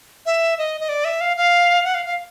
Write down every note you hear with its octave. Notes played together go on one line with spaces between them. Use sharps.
E5
D#5
D#5
D5
E5
F5
F5
F#5
F5
F5